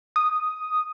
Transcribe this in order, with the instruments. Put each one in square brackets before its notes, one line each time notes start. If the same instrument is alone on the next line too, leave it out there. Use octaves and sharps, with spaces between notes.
[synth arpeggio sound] D#6